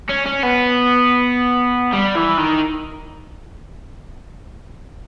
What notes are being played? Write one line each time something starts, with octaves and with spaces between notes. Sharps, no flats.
C#4
C#4
B3
G3
E3
D#3